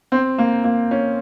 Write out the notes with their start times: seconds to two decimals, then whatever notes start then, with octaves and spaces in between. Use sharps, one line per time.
0.12 C4
0.38 A#3
0.64 A#3
0.91 C#4